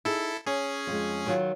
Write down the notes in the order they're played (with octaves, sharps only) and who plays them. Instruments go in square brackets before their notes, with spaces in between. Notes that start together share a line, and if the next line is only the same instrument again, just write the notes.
[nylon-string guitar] D#4 G#4 [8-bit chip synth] E4 A4
[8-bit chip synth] C#4 G#4 [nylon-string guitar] C#5
[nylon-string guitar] F2 G#3
D#3 F#3 F4